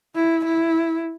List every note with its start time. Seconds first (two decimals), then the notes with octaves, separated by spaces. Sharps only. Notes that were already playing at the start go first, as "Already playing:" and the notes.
0.15 E4
0.45 E4